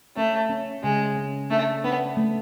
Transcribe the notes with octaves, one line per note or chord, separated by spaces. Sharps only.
A3 C#4
C#4
C#3 G#3
C#4
A3 D4
B3 D4
A3